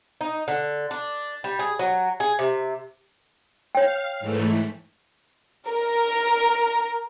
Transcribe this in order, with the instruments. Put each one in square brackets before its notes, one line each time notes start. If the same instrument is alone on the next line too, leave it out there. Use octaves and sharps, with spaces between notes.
[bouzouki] D#4
D3
D4
G3
G#4
F#3
G#4
C3
[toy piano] C#5 G5 [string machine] F5
[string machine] G#2 E3 A3
[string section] A#4